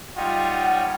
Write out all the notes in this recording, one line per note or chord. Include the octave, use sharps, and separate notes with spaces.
G3 D#4 F4 C#5 F#5 G5